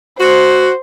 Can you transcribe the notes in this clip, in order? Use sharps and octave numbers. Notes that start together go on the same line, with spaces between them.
F#4 C5